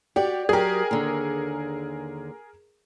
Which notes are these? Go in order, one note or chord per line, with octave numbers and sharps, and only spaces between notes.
F#4 G4 D5
F#3 G4 G#4 A#4
D#2 D3